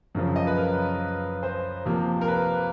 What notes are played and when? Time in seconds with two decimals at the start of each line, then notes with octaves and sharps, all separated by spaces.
0.15 F#2 C#3 F3
0.36 D#5
0.47 B4
0.57 A#4
1.43 C5
1.85 C3 F3 A#3
2.21 A#4
2.28 B4